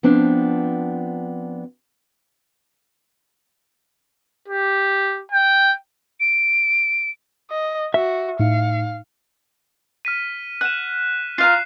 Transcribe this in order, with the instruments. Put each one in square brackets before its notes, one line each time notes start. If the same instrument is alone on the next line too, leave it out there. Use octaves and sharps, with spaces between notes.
[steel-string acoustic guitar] F3 B3 C4 D4
[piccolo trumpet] G4
G5
[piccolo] D7
[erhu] D#5
[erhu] F#4 [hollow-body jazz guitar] E5
[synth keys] A2 D#4 C#7 [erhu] F5
[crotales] F6 B6 D#7
[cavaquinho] F#5 [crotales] F#6 E7
[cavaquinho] F4 F5 A#5 [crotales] C7